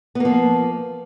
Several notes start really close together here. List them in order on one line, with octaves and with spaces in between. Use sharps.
B3 A#3 F3